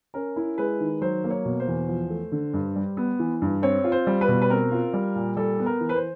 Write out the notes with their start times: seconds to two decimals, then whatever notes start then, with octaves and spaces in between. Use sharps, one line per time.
0.14 C#4 A#4
0.36 E4
0.58 G#3 B4
0.80 D#3
1.01 F#3 C5
1.24 A#3
1.30 C#5
1.45 B2
1.60 C5
1.67 E2
1.89 F3
2.10 A3
2.32 D3
2.54 G2
2.76 G3
2.97 B3
3.19 E3
3.42 G2
3.62 C4 C#5
3.84 F4
3.92 C5
4.07 G3
4.21 B4
4.28 B2
4.42 B4
4.50 C4 A#4
4.72 F4
4.93 G3
5.16 A#2
5.37 G3 A4
5.59 B3
5.66 A#4
5.81 E3
5.89 B4
5.96 C5